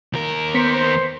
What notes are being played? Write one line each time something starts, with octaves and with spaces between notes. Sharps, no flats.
D#2 A#4
B3 C5 B6 C#7